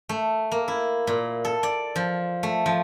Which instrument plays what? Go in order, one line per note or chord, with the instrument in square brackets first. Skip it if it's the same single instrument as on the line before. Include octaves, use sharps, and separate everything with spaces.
[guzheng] A3
A#3
E4
A#2
A4
D5
F3
A3
F3